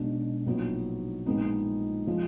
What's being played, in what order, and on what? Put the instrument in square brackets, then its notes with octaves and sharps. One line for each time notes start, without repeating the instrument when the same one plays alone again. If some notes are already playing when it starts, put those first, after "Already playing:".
Already playing: [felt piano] B1 B2 G#3 D4
A#1 A#2 F#3 B3 D#4
A#1 A#2 G#3 B3 D#4
F3 G#3